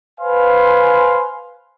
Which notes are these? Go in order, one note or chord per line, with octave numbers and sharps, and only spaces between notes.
B4 C5 F5 G#5 C6